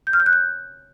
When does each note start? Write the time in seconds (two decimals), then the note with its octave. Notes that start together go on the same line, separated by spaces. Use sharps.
0.07 G6
0.13 F6
0.20 G6
0.26 F#6
0.33 G6